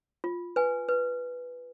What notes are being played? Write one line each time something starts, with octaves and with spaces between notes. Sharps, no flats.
F4
B4 G#5
B4